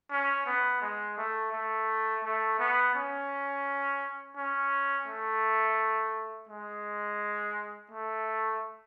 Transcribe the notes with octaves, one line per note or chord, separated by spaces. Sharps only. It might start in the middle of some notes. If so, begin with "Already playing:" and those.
C#4
B3
G#3
A3
A3
A3
B3
C#4
C#4
A3
G#3
A3